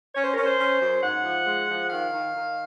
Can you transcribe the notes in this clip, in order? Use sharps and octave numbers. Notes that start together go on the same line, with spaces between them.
C#4 C#5
C5
C#4 A#4
C5
C#4
F#2
G#2 F#5
F3
G#3
F3
D#3 F5
D#3
D#3